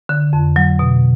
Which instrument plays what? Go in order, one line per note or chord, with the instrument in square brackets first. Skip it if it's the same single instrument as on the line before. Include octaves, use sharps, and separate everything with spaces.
[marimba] D3
F2
F#3
B2